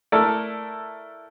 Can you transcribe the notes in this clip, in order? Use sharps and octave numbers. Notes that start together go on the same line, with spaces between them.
A3 E4 A4 A#4 D5